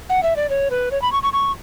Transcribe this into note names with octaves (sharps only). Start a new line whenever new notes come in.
F#5
E5
D5
C#5
B4
C#5
B5
C#6
C#6
C#6